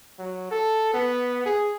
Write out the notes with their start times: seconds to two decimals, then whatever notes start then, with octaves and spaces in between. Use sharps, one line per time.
0.19 F#3
0.51 A4
0.94 B3
1.46 G#4